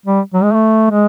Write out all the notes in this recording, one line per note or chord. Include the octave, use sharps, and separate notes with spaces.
G3
F#3
G#3
A3
G#3